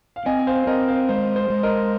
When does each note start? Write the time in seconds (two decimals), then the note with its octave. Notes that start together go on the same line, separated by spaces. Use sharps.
0.16 F5
0.26 C4 D#5 G#5
0.39 G#5
0.47 C5 F5
0.67 C4 A#4 D#5
0.88 C5 F5
1.09 G#3 C5
1.36 C5
1.50 G#3
1.63 A#4 D#5